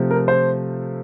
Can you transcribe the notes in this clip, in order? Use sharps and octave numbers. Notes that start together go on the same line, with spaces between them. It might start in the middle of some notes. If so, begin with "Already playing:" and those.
Already playing: C3 F3 A3
A#4
C5